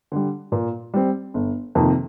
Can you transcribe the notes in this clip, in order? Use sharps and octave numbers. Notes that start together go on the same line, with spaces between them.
D3 G3
A#2
G3 C4
G1
F2 C3 D#3 A#3